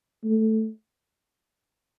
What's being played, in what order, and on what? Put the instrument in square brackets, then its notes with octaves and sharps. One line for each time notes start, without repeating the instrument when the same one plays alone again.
[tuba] A3